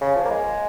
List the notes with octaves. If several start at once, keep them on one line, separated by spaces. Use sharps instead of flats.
C#3
F3
A#3
G#3